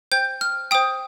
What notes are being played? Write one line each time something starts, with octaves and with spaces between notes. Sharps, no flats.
C5 G5 G6
F6
C5 G5 D#6